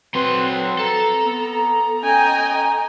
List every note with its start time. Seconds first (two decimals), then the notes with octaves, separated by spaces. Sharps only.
0.14 F#3 C4 B4 C6
0.79 A4 A#5
1.25 B3
2.03 C#4 D#5 G5 G#5